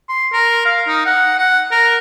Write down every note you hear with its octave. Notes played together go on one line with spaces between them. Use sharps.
C6
A#4
F5
D#4
F#5
F#5
A#4